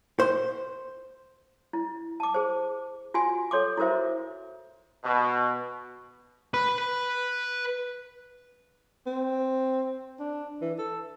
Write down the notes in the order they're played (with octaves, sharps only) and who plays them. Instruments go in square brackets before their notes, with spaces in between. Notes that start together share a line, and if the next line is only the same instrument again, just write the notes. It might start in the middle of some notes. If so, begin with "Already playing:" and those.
[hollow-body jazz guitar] C5
[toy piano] E4
A5 D6
G#4 C5
F4 F#4 G#5 C6
A4 C#5 C6 D6
E4 F#4 A#4 C5 E5
[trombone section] B2
[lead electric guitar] B4 B5
[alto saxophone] C4
D4
E3
A4